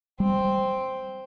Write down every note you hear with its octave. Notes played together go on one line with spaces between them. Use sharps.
G3 C4